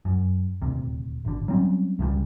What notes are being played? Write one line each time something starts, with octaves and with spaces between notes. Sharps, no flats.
F#2
D#1 D2 C3
G#1 D3
F#3 G3 C4 C#4
C#2 C#3 F3 G3